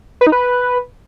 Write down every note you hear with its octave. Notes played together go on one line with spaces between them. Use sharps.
B4
D#4
B4